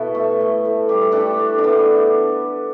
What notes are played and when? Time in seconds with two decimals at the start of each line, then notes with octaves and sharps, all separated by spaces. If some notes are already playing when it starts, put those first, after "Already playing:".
Already playing: B2 E4 A4 B4
0.15 A3
0.40 A2
0.65 A2
0.89 G3 G4
1.01 A4
1.12 A2 D4 G4
1.39 A2
1.58 D4
1.64 A2 B3